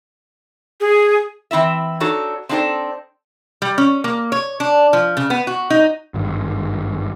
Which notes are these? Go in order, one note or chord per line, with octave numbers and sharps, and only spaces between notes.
G#4
E3 C4 E4 E5
D4 D#4 F#4 A4 C#5
C4 D4 D#4 F#4 A4 C5
G3
C#4
A#3
C#5
D4
F3
C#3
B3
F#4
D#4
G#1 G2